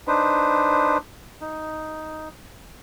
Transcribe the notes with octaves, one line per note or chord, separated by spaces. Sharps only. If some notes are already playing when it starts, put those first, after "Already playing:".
D4 D#4 B4 C5
D#4